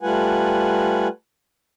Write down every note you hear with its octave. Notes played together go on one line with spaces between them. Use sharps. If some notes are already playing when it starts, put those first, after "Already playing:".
G3 A3 F4 B4 F#5 G#5